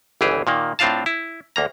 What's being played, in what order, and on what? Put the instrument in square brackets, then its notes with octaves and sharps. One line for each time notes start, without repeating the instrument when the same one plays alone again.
[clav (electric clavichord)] G1 C#2 E3 G4 G#4
A#2 D#3 A#3
A2 C4 D4 F4 F5 A5
E4
D2 A#3 A#5